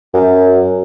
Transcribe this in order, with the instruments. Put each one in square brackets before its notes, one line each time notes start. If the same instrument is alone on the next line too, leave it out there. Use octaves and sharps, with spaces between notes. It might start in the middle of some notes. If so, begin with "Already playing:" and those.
[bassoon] F#2